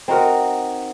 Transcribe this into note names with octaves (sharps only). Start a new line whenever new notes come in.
C4 D#4 F#4 A#4